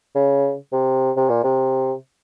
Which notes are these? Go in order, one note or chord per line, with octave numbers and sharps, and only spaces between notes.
C#3
C3
C3
A#2
C3